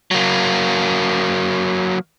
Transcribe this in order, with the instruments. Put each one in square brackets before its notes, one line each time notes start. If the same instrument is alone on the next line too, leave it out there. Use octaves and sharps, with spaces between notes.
[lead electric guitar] F#3 A#3